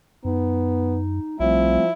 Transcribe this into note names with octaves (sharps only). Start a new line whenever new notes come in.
F#2 B3 D#4
B1 F3 G3 A3 C4 E4